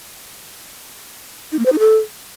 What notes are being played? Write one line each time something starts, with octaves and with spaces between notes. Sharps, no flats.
D#4
A#3
C5
D#4
A4